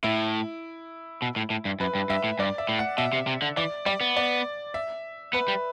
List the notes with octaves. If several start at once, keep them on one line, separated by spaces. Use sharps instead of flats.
A2 E4
B2
A2
A2
G2
F#2 B4
G2
G2 E5
A2
G2 D5
E5
A2
F#5
B2 E5
C3
C3
D3
E3 D5
G3 D5
B3
D5
E5
B3 B4
G3